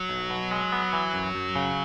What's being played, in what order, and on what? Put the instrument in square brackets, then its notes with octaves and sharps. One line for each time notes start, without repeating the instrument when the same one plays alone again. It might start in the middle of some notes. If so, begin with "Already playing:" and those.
Already playing: [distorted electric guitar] F#3
[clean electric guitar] B1
B2
G#3
B3
E3
F#2
F#2
C#3